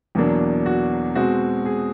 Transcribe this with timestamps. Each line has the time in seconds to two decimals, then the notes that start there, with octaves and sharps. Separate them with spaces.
0.15 E2 B2 F#3 A#3 D4
0.66 F#4
1.15 B2 G#3 C4 F#4
1.66 G#4